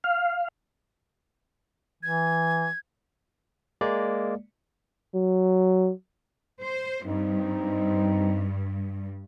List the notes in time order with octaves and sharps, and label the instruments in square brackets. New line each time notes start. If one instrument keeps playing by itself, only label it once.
[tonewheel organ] F5
[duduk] E3 [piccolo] G#6
[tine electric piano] G#3 A#3 D5
[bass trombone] F#3
[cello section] C5
[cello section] G2 [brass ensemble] C4 D#4